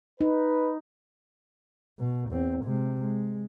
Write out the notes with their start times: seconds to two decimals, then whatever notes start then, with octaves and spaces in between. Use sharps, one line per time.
0.21 D#4 B4
1.99 B2
2.30 E2 C4
2.64 C3 G#3
3.01 G#3